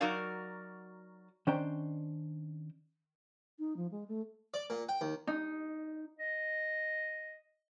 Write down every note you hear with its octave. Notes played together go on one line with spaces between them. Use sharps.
F#3 D#4 F#4 A#4 D5 F5
D#3 C#4 D4 C5 G5 A#5
D#4
F3
G#3
A3
D5
A#2
G5
D#2
D#4
D#5